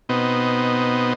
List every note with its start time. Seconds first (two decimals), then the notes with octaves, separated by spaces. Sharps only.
0.09 B2 B3 C4 D#4